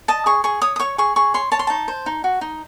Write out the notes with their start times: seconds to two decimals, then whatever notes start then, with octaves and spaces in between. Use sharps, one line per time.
0.08 D#5 A5
0.26 G#4 C#6
0.44 G#4 C#6
0.62 C#5 D#6
0.76 D#6
0.79 C#5 C#6
0.98 G#4 C#6
1.16 G#4 C#6
1.34 C#5 C6
1.52 C#5 A5
1.59 C6
1.67 D#4 A5
1.88 C5
2.06 D#4
2.24 F#4
2.41 D#4